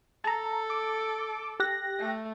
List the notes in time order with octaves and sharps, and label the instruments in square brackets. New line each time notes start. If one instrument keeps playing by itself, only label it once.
[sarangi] A4 [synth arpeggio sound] A5 A#5
[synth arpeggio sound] D6
G4 F#6 A#6
[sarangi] A3